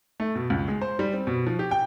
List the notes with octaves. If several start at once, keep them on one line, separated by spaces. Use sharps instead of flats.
A3
B2
C#2
G#3
C5
G3
C4
B2
F3
G4
G5